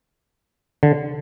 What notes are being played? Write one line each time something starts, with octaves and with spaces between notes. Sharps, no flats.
D3